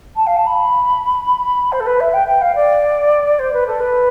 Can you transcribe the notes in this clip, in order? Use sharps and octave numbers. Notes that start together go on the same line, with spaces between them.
A5
F5
A5
B5
C5
A4
B4
E5
G5
G5
F5
D5
C5
B4
A4
B4